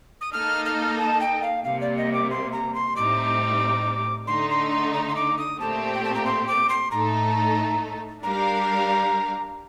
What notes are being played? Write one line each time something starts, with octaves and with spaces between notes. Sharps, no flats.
D#6
A#3 D#4 A4 D#5 F6
F6
A5
G5
F5
C3 G3 A#3 F5
D5
D#5
D6
C6
A#5
C6
A2 G3 C4 D#4 D6
D3 A3 D#4 C6
C6
C6
A#5
C6
D6
D#6
A#2 A3 C4 G4 A5
G5
A5
A#5
C6
D6
C6
A2 A3 D#4 A4 A#5
G3 D4 G4 A#4 F5 A#5